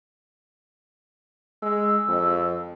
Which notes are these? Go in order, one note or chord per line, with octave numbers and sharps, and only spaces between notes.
G#3 E6
F2